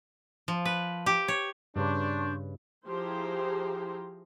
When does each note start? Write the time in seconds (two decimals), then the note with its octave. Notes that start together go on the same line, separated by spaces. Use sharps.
0.48 F3
0.65 B4
1.06 G4
1.28 C#5
1.76 G2 C#3 D4 B4 C6 C#6 G6
2.85 F3 E4 G4 G#4 C5 A#5